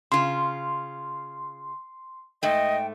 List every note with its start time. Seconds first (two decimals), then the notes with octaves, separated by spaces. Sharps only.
0.12 C#3 F4 C6
2.43 G#2 A3 D#5 G5